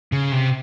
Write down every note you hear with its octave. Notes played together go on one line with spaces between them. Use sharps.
C#3
C3